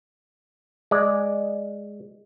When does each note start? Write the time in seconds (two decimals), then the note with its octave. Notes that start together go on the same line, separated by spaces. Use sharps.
0.91 G#3 D5